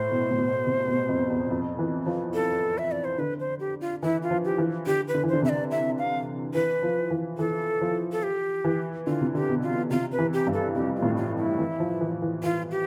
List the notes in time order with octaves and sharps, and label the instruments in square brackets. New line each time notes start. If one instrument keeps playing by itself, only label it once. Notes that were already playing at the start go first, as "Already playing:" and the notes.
Already playing: [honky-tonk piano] A2 [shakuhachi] C5
[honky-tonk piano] B2
A2
B2
C3
B2
F2
E2
F2
E3
F3
[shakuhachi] A4
E5
D5
C5
[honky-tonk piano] D3 [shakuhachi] B4
[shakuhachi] C5
G4
F4
[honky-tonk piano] E3 [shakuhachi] E4
[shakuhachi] F4
[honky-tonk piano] F3
[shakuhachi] G4
[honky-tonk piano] E3
[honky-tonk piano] D3 [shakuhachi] G4
[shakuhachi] B4
[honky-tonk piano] D3
E3
[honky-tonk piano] D3 [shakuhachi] C5
[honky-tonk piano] C3 [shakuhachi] E5
[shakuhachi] D5
E5
F5
[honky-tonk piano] E3 [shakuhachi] B4
[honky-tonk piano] F3
E3
[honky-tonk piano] E3 [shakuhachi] A4
[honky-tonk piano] F3
[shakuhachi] A4
G4
[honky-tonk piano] E3
[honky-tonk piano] D3 [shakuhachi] F4
[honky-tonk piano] C3
[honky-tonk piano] D3 [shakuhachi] G4
[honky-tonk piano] B2
[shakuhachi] F4
[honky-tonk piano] C3 [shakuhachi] F4
[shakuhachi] B4
[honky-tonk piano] E3
[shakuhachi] G4
[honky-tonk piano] G2
[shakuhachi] A4
[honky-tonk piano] F2 [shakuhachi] G4
[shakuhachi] F4
[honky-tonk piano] A2
[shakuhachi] F4
E4
[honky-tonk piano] E3
F3
E3
E3
[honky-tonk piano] E3 [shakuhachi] F4
[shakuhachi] G4